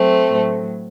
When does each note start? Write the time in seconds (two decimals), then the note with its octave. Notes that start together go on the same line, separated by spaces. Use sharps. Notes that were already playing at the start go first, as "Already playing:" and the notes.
Already playing: F#3 A3 C4
0.29 A2 F#3